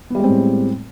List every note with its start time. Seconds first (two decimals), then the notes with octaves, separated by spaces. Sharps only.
0.10 B3
0.15 G3
0.19 G#3
0.24 C4
0.28 A2